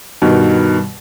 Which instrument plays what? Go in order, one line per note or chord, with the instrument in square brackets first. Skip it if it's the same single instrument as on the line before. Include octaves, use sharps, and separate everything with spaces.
[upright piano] G2 B2 D#3